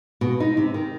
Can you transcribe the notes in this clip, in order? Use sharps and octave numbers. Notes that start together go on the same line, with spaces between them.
B2
D#4
C3
D#3